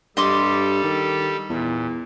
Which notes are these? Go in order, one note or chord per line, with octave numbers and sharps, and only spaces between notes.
G2 G3 G4 A4 D#5 C6 D6
D#3
E2 A#2